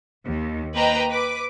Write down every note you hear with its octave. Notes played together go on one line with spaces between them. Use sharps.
D#2
A#3 B4 C5 D#5 G5 A#5
B4 D6